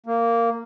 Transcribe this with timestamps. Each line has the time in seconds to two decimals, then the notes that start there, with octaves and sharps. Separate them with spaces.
0.06 A#3